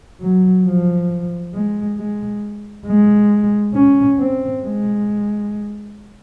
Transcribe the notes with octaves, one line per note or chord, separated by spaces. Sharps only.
F#3
F3
G#3
G#3
G#3
C#4
C4
G#3